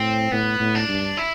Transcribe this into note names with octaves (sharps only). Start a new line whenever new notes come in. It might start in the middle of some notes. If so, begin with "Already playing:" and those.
Already playing: A2 C4
A2 B3
A2
D4
G2
E4